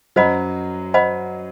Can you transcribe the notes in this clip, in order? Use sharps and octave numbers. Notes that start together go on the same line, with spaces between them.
F#2 F#3 C5 D#5 F#5 B5
C5 D#5 F#5 B5